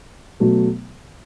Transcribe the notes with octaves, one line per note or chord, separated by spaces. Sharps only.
B2 F#3 A3